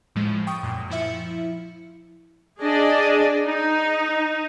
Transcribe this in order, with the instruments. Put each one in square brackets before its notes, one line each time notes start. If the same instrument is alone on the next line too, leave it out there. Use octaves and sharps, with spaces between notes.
[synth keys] A2 F3 G#3
G5 C#6 D#6
F#2 A#2
F3 E4 E5 C#7
[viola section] D4 G#4 D5 D#5
D#4